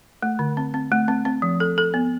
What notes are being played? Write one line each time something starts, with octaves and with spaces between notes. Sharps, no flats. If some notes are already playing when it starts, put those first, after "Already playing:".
A3
D3
C4
C4
A3
C4
C4
F3
A4
A4
B3